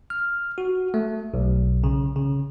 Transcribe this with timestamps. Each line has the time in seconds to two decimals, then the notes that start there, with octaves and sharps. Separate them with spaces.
0.10 F6
0.58 F#4
0.94 A3
1.34 B1
1.84 C#3
2.16 C#3